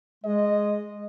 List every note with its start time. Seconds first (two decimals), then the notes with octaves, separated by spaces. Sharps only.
0.24 G#3 D#5